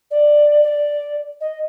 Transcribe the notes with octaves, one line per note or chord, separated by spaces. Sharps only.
D5
D5
D#5